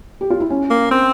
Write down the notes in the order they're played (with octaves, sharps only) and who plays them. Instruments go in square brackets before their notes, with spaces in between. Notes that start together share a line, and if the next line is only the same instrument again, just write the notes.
[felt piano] G4
F4
E4
C#4
[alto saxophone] A#3
C4